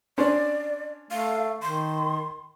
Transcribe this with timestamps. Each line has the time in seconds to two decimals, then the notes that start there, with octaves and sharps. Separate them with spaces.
0.18 C#4 D4 C5 D5
1.11 A3 F5
1.62 D#3 C6